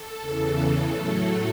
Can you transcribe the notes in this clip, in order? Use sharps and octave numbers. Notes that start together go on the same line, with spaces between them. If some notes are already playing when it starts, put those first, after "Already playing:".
Already playing: A4
E2 C#3 E3
A2 F#3 A3